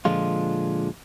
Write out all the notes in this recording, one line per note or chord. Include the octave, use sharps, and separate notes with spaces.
A#2 D3 F3 G#3 F4